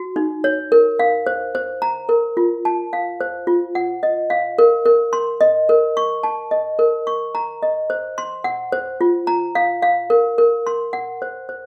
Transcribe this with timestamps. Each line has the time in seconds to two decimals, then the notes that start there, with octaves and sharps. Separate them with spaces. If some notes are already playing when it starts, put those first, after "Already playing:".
Already playing: F#4
0.16 D#4
0.44 C#5
0.72 A#4
0.99 F5
1.26 C5
1.55 C5
1.82 A#5
2.09 A#4
2.37 F4
2.65 A5
2.93 F5
3.21 C5
3.47 F4
3.75 F#5
4.03 D#5
4.30 F5
4.58 A#4
4.85 A#4
5.13 C6
5.41 D#5
5.69 A#4
5.97 C#6
6.23 A5
6.51 D#5
6.79 A#4
7.07 C#6
7.35 A#5
7.62 D#5
7.90 C5
8.18 C6
8.44 F#5
8.72 C5
9.01 F4
9.27 A#5
9.55 F5
9.82 F5
10.10 A#4
10.38 A#4
10.67 C6
10.93 F#5
11.22 C5
11.49 C5